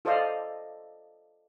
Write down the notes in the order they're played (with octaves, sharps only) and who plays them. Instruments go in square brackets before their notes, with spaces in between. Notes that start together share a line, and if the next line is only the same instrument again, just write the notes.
[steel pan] F4 A4 C5 D5 D#5 F5